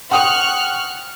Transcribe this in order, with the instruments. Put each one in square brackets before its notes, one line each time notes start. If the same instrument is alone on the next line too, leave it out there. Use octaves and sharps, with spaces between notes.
[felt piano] F#5 G5 D#6 [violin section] C#6 F6 F#6